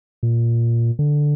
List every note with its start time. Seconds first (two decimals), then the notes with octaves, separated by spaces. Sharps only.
0.23 A#2
0.99 D3